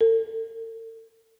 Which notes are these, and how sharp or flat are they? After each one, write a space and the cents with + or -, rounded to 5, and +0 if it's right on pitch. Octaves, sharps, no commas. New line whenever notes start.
A4 +40